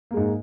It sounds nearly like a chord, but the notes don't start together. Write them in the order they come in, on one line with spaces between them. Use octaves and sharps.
A#3 G#3 G#2